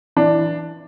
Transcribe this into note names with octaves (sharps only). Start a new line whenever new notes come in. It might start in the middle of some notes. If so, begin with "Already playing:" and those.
E3 D4